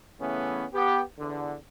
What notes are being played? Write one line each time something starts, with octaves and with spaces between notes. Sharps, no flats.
C#3 E3 A3 B3 C#4
B3 G4
E2 D3